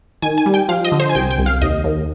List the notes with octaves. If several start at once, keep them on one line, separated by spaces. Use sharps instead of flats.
D#3 G#5
G#5
G3
G5
F3 F5
D#5
D3
C5
G#5
C2 G5
G5
C2
F5
D#2 D#5
D#2